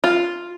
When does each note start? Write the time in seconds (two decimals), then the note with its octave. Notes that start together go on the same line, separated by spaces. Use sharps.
0.04 F4